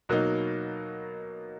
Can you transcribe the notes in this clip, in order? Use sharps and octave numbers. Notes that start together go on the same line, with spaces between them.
B2 F#3 A#3 D#4